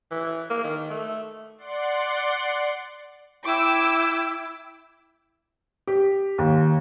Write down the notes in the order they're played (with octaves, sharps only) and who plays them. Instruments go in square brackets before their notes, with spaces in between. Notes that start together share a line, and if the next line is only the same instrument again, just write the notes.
[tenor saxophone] E3
A#3
D#3
A3
[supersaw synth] D5 F#5 C6
[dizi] E4 [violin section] G5 D6 E6
[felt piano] G4
D#2